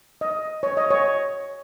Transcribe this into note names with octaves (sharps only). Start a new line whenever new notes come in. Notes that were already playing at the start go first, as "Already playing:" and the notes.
D#5
C#5
D#5
C#5